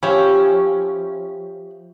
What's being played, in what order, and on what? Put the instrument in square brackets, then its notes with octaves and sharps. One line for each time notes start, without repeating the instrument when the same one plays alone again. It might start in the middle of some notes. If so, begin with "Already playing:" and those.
[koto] F3 [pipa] C#4 [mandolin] G4 E5 B5